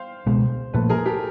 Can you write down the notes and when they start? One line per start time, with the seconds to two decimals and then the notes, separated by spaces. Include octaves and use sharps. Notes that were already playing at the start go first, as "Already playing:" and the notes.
Already playing: C5 F5 G5
0.26 C#2 B2 G#3 B3
0.74 A#2 F3 A3 A4 B4
0.89 G#4 A#4
1.06 G4 A4